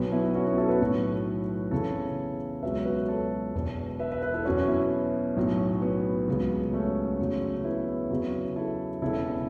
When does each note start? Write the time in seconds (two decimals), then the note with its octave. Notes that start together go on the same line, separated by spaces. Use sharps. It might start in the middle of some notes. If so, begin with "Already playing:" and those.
Already playing: B1 B2 F#3 B3
0.12 B3 E4
0.35 C#4 F#4
0.47 B3 E4
0.58 E4 A4
0.69 F#4 B4
0.81 B1 A2 F#3
1.71 E2 C#3 E3 A4 C#5
2.63 C#2 B2 F#3 B4 E5
2.85 F#4 B4
3.08 A4 C#5
3.54 E1 E2 B2
3.99 B4 E5
4.12 B4 E5
4.22 B4 E5
4.34 E4 A4
4.45 E2 B2 F#3 C#4 F#4
4.68 B3 E4
5.37 B1 A2 F#3
5.82 B3
6.28 C#2 C#3 F#3
6.73 A3 C#4
7.19 E2 C#3 F#3
7.55 C#4
7.64 B3 E4
8.11 E2 C#3 F#3
8.56 E4 A4
9.02 E1 E2 C#3 E4 A4